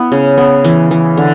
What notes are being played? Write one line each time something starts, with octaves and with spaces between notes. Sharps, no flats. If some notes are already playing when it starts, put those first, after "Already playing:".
Already playing: B3 E4
C#3
B3
E3
E3
D3